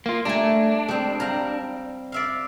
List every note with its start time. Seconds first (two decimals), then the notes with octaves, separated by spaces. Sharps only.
0.06 A#3 F4
0.25 G3 A3 D4 G#5 A#5
0.88 G3 G#3 C4
1.20 G3 F5 A#5
2.12 D5 E5 F5